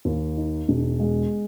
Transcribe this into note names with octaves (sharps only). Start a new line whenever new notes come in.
D#2
D#4
E1
G#3